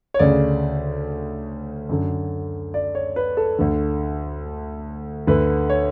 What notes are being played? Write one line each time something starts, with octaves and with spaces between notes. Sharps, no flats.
C#5
D2 C#3 D5
F#2 D3
D5
C#5
B4
A4
D2 D3
D2 D3 B4
C#5